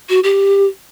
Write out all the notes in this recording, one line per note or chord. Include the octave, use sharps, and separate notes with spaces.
F#4
G4